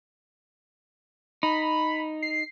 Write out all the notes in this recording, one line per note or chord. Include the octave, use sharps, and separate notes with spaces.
D#4 B5
C7